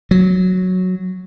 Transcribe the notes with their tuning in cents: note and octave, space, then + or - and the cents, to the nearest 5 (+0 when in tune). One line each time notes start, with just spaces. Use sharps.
F#3 -5